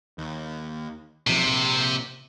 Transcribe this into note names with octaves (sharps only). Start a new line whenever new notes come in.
D#2
D#1 B1 C3 F3
A#1